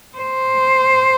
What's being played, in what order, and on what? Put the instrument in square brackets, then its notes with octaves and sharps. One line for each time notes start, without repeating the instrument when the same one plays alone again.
[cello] C5